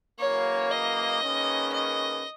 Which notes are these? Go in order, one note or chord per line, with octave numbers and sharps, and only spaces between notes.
F#2 C#3 E3 A#3 C#5
D#5
D#3 A#3 C#4 G#4 B4
D#5